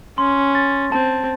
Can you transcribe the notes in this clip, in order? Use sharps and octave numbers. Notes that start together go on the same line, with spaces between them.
C#4 C6
A6
C4 A5